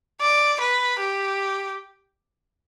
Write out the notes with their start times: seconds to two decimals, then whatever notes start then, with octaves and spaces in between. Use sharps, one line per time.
0.21 D5
0.60 B4
0.99 G4